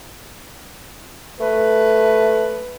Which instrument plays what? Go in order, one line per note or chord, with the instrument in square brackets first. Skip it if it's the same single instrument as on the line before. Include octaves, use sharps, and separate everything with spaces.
[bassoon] A3 [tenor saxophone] B4